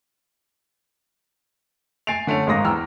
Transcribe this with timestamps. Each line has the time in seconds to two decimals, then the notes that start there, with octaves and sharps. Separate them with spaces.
2.07 G#5 A6 C7 D7 F7
2.27 D3 A3 C#4 F7
2.47 G#1 G#2 A#3 C6 D#6 A#6
2.64 E2 E3 G5 A#5 E6 F6